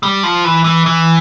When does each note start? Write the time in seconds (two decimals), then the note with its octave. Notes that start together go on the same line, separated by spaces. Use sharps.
0.03 G3
0.23 F3
0.45 E3
0.65 E3
0.86 E3